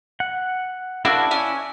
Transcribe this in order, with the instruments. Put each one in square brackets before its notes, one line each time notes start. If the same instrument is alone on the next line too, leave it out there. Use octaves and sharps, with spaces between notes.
[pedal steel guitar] F#5
[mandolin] A#3 D4 F#4 [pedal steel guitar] E4 D5 E6
[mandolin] C#4 G#5